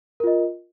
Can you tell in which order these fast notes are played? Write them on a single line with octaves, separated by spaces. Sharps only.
A#4 F4 D#5